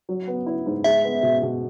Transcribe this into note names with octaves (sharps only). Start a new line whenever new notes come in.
F#3
B3
E4
G#2
G#3 E5
B3
B2
B2